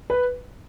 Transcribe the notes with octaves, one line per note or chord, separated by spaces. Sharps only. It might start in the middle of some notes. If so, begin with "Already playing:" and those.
B4